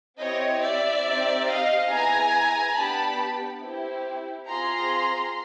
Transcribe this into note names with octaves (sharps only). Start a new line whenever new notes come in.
C4 E4 G4 C#5 D#5
D5 E5
C4 D#4 G4
D#5 F5
B3 E4 G#4 G#5 A#5
B3 D4 G4 A5 B5
C4 E4 G4
C4 F4 G#4 A#5 C6